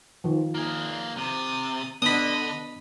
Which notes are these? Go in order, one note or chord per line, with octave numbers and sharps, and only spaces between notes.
D#3 F3
A#3 G#4
C3 D#6 A6
D3 B3 D4 B4 D#5 B5 D#6